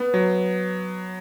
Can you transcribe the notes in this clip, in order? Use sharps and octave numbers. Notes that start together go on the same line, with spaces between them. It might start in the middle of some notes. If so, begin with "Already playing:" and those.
Already playing: B3
F#3